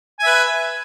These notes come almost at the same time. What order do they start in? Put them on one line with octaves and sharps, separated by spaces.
G#5 E5 B4